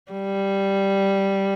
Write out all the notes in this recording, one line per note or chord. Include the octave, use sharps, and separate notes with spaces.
G3